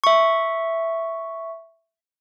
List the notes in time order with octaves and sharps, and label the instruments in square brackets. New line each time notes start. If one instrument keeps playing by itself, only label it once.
[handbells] E5 C#6